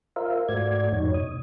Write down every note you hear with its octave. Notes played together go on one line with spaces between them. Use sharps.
F4 A#4 C5 E5 F5
G#2 A3 F#4 D5 G#6
F2 A2 D#4 C#5
B2 D#6